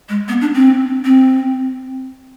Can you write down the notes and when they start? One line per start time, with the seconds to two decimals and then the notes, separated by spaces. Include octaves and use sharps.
0.09 G#3
0.28 B3
0.41 D4
0.54 C4
1.05 C4